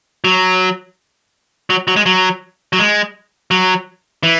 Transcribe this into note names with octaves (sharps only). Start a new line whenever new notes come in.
F#3
F#3
F#3
G#3
F#3
F#3
G#3
F#3
E3